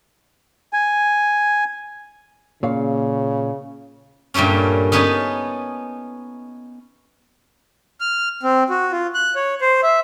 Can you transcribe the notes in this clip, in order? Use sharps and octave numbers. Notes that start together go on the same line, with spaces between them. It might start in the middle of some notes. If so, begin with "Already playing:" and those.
G#5
A#2 C#3 C#5 F5
G2 A#2 G3 A3 C#4
B3 C#4 D#4 B4 G#5 A5
F6
C4
F#4
F4
F#6
C#5
C5
E5